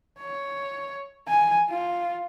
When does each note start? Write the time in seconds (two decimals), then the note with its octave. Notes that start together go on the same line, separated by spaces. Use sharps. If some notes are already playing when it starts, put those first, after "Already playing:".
0.19 C#5
1.28 G#5
1.70 F4